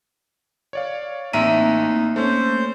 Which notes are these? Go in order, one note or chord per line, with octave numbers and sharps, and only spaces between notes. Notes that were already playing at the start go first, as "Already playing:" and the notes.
C#5 D5 F5
A1 A#3 C4 D#4 E5 A#5 D#7
A3 C#4 C5